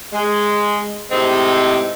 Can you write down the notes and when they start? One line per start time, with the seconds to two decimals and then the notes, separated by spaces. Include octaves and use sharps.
0.12 G#3
1.10 A2 C3 G#3 C4 D#4